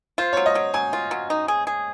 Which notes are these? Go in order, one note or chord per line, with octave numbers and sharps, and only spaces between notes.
F4 C5
F#3 C#5
D#5
F#3
F#3 G#5
F4
F#3
D#4
G#4
G#4